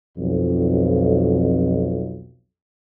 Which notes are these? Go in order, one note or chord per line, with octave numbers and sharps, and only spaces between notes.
B1 F2